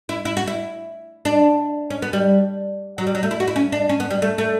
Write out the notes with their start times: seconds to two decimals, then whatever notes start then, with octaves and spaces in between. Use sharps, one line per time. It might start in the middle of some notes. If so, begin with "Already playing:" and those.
0.09 E4
0.25 E4
0.37 F#4
0.47 E4
1.25 D4
1.90 C#4
2.02 B3
2.13 G3
2.98 F#3
3.07 G3
3.15 F#3
3.23 A3
3.31 E4
3.40 F#4
3.48 E4
3.56 C#4
3.72 D4
3.89 C#4
4.00 B3
4.11 G3
4.22 A3
4.38 A3